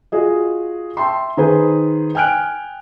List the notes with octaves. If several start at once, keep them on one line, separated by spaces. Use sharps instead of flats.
F4 F#4 G#4 D#5
E5 G5 A5 C6
D#3 D#4 G#4 B4 C5
G5 G#5 F6 F#6 D7